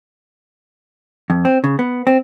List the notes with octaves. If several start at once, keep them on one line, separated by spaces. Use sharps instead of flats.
F2
C4
C#3
B3
C4